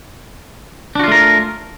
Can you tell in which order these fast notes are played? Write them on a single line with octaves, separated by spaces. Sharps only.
D4 F#4 F4 A3 A#4